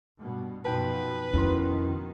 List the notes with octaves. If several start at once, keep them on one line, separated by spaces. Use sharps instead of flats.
G2 B2
F#2 B2 F3 D#4 B4 G5 A5
F2 B2 D#3 C#4 E4 C6